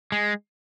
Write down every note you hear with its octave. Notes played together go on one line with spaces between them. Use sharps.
G#3